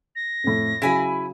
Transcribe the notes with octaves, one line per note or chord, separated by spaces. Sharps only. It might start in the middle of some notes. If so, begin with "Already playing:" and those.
A#6
F2 A2
C#3 F#3 E4 G#5 B5